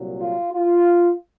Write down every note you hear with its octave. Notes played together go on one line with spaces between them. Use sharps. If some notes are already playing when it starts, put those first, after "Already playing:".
Already playing: C2 A#2 F#3
F4
F4